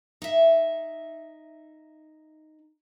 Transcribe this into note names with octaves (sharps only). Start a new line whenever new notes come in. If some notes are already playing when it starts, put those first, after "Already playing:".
D#4 E5